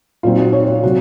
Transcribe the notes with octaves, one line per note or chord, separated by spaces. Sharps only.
A#2 F#3 C4 D#4 F4
F#4
C#5
C#5
C3 F#3 F#4